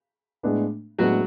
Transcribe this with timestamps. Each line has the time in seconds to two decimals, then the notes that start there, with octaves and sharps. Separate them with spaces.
0.43 A2 G#3 B3 D4
0.99 A2 F#3 G#3 B3 D4 F#4